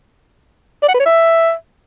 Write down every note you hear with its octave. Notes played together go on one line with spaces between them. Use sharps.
D5
F#5
B4
C#5
E5